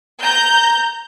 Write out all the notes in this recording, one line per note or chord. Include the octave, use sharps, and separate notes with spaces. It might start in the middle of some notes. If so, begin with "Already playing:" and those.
A#5 G6